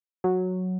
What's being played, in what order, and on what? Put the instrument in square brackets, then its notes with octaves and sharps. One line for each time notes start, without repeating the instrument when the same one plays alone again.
[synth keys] F#3